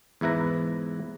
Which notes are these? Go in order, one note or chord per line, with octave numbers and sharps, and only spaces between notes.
E2 G#2 E4 B4 A#5